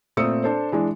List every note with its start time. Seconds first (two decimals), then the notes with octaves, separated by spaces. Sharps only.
0.17 A#2 A3 C4 D#6 E6 C#7
0.44 D4 A4 C5
0.72 E3 G#3 D4